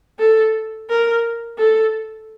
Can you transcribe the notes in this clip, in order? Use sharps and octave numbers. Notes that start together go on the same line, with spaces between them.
A4
A#4
A4